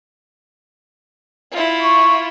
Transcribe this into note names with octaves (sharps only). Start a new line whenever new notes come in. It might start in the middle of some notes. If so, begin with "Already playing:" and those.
E4 F4
C#6